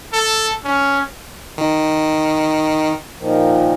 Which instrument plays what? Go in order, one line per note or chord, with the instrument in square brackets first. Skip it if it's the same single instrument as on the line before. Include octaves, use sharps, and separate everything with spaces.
[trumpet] A4
C#4
[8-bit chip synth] D#3
[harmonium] A#2 D#3 F3